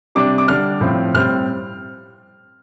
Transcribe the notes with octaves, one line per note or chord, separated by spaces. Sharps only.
C3 G3 D4 D6
D6
D3 G3 D4 F6
A2 F3 C4
A2 G3 C4 F6